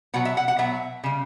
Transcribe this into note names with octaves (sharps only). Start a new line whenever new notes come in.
B2 F#3 F#5
E5
F#5
F#5
B2 F#3 E5
C#3 G3